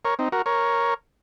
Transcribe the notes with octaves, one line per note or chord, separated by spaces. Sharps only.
A#4 C#5
C4 D#4
F#4 A#4
A#4 C#5